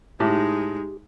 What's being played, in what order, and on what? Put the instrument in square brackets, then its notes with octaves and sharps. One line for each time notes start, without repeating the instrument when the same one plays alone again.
[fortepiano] A2 [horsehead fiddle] G#3 D#4 [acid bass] G4